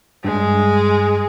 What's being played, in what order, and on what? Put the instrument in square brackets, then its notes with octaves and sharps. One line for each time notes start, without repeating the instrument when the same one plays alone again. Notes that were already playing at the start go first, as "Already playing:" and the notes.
[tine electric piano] G2 [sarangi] G#3